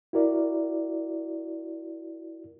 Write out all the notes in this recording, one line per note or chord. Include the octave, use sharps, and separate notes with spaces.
E4 F#4 A#4 D5